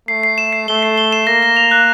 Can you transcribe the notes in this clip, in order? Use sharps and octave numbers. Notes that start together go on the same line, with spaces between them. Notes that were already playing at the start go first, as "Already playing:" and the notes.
A3 C7
C7
E7
C7
A3 G7
C7
G7
E7
A#3 A#6
A#6
F7
F#6